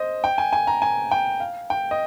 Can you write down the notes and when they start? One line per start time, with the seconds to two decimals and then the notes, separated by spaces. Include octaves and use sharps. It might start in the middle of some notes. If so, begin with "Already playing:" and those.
Already playing: C5 D#5
0.24 G5
0.38 G#5
0.53 G#5
0.67 A#5
0.82 G#5
1.11 G5
1.40 F5
1.70 G5
1.91 D#5